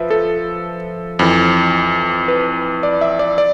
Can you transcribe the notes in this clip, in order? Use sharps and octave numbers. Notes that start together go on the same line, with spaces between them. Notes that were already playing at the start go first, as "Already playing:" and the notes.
Already playing: F3 B4 E5
A4
F2 E3
B4
D5
E5
D5
D5